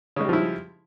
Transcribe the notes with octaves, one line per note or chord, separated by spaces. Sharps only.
C#3 F3 G3 G#3 E4